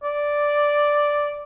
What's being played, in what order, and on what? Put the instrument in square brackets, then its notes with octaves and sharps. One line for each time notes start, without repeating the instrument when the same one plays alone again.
[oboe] D5